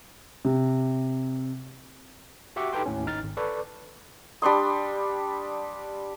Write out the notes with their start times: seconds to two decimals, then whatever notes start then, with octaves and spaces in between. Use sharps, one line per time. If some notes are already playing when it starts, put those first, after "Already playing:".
0.45 C3
2.56 F#4 G4 E5 F#5 C#6 D6
2.73 D#4 G4 A4 B4 G5 C6
2.86 D#2 A2 C#4
3.06 G#1 D#4 F6 A6
3.24 G#1
3.37 A4 B4 D5 C#6 D6
4.42 G3 D4 C6 D#6